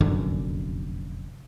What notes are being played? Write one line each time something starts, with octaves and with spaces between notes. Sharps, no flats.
F1 A#1 F#2 D3